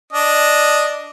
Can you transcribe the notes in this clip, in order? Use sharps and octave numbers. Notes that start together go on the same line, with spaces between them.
D4 D#5